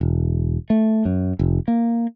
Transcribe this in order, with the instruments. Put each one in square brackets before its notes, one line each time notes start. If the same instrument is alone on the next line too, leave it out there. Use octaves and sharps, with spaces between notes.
[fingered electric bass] E1
A3
F#2
F1
A#3